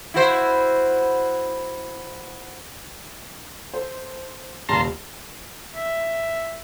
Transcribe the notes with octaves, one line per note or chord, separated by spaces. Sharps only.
E4 F#4 C5
A4 C5
D#1 C#3 G3 F5 A5 A#5 C6
E5